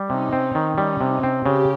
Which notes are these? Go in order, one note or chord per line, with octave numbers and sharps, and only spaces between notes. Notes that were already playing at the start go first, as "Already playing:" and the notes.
Already playing: G3
C3 C#4 D#4
C4
D#3
G3 C#4 D#4
C3
C4
C#3 G4